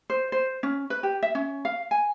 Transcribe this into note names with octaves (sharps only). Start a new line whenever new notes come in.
C5
C5
C#4
B4
G4
E5
C#4
F5
G#5